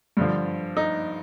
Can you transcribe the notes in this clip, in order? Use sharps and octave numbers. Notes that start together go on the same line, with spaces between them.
G2 D3 F3
D#4